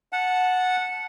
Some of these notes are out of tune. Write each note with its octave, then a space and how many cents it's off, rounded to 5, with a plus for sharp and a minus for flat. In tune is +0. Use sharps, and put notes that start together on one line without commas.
F#5 -10 A5 -10